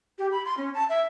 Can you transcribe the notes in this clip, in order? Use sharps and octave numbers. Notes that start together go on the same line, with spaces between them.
G4
B5
C6
C#4
A5
E5